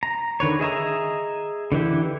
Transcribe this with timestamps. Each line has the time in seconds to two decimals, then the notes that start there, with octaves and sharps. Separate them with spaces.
0.03 A#5
0.40 D3 D#3 B4 C#5
0.60 G#4 D#5 E5 A#5
1.72 D3 E3 E4 G4